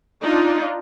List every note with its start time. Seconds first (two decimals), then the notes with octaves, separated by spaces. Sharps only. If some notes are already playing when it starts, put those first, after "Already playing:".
0.23 D4 D#4 F4